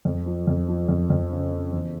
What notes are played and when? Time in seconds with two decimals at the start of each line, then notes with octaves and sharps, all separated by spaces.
0.05 F2
0.26 F3
0.47 F2
0.68 F3
0.88 F2
1.10 F2
1.30 C#3
1.52 C#3
1.73 E2